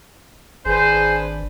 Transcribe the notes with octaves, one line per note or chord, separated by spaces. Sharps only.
G#1 D4 G#4 B4 C5